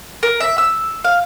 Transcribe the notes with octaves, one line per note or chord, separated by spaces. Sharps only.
A#4
E5
E6
F5